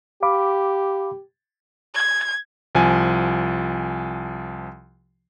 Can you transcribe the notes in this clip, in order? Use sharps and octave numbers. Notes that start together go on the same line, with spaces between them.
G4 F5 B5 D6
G#6
C2 F3 G#5